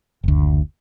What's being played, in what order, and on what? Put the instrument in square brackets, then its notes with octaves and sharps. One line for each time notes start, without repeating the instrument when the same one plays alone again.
[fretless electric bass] F#1 D2